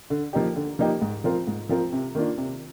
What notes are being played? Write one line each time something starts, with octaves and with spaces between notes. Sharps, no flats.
D3
F3 A#3 D#4 G4
D3
F3 A#3 D#4 G4
G#2
F3 C4 F4 A#4
G#2
F3 C4 F4 A#4
C3
D#3 A#3 D4 F4
C3